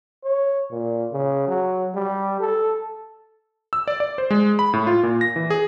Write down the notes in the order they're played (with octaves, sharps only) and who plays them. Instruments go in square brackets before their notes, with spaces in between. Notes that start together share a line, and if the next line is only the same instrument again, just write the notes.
[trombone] C#5
A#2
C#3
F#3
G3
A4
[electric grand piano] E6
D5
D5
C5
G#3
B5
A2
F4
A#2
A#6
E3
G#4